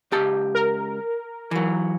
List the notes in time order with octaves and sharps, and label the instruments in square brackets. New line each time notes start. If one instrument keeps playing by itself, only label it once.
[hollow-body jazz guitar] C#2 G4 A5
[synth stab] A#4
[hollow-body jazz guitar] E3 F#3